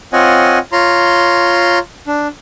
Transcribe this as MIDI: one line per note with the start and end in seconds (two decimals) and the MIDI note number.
0.13 0.59 60
0.13 0.59 65
0.13 0.59 73
0.13 0.59 75
0.13 0.59 78
0.13 0.59 80
0.72 1.79 65
0.72 1.79 73
0.72 1.79 82
0.72 1.79 84
2.07 2.28 62